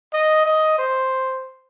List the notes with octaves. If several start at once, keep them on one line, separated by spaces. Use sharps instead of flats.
D#5
D#5
C5